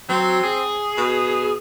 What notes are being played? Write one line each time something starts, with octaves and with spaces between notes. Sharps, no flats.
F#3 C4
G#4
B2